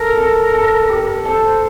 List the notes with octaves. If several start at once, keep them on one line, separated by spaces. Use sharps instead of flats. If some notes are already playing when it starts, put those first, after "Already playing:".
Already playing: A4 A#4
A4
A4
G4
A4 C5